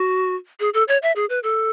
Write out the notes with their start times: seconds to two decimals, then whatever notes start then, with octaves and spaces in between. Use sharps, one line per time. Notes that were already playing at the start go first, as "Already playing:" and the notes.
Already playing: F#4
0.60 G#4
0.74 A4
0.88 C#5
1.02 E5
1.16 G#4
1.30 B4
1.43 A4